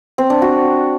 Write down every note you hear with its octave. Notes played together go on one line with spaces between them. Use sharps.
C4
D4
F#4